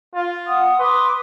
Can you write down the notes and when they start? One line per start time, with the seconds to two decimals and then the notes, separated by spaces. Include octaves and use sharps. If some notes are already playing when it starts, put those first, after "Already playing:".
0.15 F4
0.47 F#5 D#6
0.79 B4 C6 D6 D#6